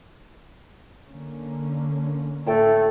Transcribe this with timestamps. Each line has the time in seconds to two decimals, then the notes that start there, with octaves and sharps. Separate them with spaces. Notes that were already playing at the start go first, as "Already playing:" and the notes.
1.07 D3 A#3 C#4
2.46 A2 A3 G5 A5